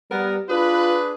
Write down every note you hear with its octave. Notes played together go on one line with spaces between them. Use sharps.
G3 B3 A#4
D4 F4 G#4 B4